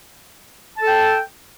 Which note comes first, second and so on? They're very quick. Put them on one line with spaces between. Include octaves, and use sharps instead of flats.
A5 A4 G5